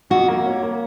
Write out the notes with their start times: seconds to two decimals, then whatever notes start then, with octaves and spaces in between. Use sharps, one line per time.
0.10 F2 F#4
0.28 A#3
0.46 C#4
0.63 A#3